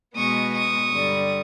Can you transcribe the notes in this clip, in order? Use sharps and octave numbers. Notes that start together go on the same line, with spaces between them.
B2 G#3 B3 C#6 D#6
C#6 D#6
G2 D3 G3